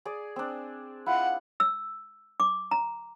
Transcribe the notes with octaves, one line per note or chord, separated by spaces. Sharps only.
G#4 D5
C4 D4
E4 F4 F#5
E6
D6
A#5